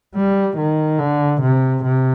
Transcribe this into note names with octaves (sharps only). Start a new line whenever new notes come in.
G3
D#3
D3
C3
C3